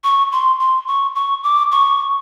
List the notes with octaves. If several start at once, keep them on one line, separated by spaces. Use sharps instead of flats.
C#6
C6
C6
C#6
C#6
D6
C#6